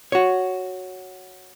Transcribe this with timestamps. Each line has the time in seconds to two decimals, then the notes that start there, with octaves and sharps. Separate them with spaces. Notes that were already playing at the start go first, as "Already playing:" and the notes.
0.12 F#4 C#5